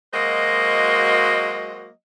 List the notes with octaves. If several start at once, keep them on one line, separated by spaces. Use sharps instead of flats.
F#3 G#3 A#3 F#4 C5 D#5